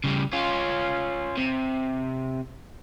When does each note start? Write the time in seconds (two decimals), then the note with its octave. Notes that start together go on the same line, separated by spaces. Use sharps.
0.04 C#3 G3
0.33 C#4 F4
1.37 C3